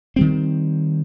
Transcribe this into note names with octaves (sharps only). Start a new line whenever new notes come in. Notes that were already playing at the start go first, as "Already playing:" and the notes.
D#3 G3 C4